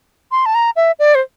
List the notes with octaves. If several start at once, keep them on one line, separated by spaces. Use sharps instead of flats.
C6
A5
A#5
E5
D5
C5